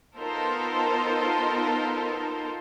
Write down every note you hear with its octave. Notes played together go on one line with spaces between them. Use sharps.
B3 D#4 F4 A4 A#4 C5